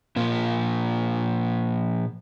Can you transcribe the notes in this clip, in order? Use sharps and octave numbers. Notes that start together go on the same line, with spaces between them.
A#2 F3 A#3 F4